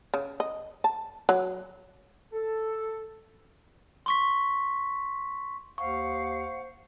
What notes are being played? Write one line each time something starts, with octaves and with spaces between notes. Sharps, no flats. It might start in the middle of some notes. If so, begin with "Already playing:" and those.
C#3
D#5
A5
F#3
A4
C6 C#6 B6
D#2 C5 F5 F#5 C#6